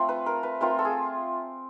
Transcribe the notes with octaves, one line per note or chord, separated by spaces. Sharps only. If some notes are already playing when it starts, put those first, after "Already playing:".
Already playing: A3 C4 F4
B4
A#4
B4
A3 C4 F4 A#4
A4
G#4